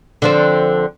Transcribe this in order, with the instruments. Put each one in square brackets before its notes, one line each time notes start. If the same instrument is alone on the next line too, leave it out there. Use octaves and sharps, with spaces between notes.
[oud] D3 F3 C4